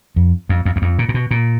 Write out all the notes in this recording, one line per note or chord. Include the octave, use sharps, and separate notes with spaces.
F2
F2
F2
E2
F2
A#2
A#2
B2
A#2